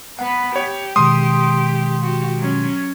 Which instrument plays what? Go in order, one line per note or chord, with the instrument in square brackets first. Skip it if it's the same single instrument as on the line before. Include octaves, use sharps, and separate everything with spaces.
[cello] B3 B4 [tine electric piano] F#5
[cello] G4 [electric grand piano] C#5
[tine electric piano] B2 D#3 G#3 [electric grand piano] C6 D#6
[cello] F#4 G4
F#3 C#4